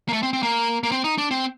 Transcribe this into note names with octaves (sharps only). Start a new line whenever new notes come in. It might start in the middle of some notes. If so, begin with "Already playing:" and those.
A#3
A3
C4
C4
A#3
A#3
C4
D#4
D4
C4